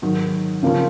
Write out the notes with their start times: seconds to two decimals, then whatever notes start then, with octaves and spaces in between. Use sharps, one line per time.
0.02 G#2 D#3 F#3
0.63 C#3 F3 A#3 C#4 F4